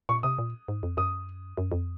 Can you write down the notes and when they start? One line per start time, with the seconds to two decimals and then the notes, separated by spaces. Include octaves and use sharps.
0.09 A#2 C#6
0.23 C3 D#6
0.38 A#2
0.68 G#2
0.83 F2
0.97 F#2 D#6
1.57 F#2
1.72 F2